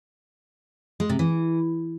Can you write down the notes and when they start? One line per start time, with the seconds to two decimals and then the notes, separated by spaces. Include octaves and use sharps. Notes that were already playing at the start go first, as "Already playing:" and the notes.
1.00 G#3
1.10 C3
1.19 E3